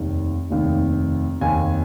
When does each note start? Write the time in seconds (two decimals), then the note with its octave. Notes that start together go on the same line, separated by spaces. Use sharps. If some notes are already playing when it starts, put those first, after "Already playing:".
Already playing: F1 D#2 D#3
0.51 F1 D#2 D#3
1.41 F1 D#2 D#3 G#5